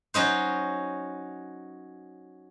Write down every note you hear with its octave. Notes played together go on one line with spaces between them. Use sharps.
F#3 C#4 D#4 C5